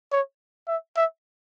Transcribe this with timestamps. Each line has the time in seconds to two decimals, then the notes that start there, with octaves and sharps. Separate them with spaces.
0.12 C#5
0.68 E5
0.97 E5